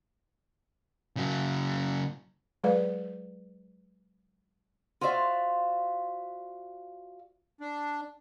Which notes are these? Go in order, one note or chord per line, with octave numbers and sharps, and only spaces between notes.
C#3 F#3
F#3 G#3 G#4 B4 D5 F5
F4 F#4 C5 D5 E5 F5
D4